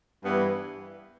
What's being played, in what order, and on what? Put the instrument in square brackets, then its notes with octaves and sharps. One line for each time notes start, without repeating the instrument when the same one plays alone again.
[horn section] G2 E3 B3